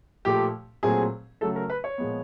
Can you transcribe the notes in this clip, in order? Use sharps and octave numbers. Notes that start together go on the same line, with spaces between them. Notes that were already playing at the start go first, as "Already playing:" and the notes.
A#2 F3 A3 G4
A#2 F#3 A3 C4 G#4
C#3 F#3 A3 A4
A#4
B4
C#5
A#2 F3 G#3 B3